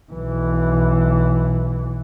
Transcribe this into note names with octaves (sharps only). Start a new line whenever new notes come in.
B1 E3